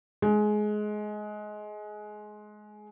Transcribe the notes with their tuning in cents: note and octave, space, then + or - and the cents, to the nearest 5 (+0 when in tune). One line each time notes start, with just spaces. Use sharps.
G#3 +20